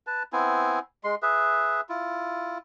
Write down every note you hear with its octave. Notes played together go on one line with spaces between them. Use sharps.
B4 A5
B3 C4 E4 G#5
G#3 C6
G#4 B4 E5
E4 F4